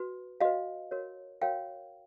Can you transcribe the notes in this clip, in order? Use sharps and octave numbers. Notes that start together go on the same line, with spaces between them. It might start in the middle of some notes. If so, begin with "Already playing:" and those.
Already playing: F#4 B4
F#4 B4 D#5 F5
F#4 A#4 C#5
F#4 A#4 C#5 F5 G5